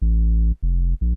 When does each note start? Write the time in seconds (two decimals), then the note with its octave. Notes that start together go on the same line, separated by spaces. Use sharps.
0.02 A1
0.63 F1
1.01 A#1